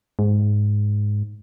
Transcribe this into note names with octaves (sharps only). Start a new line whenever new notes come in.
G#2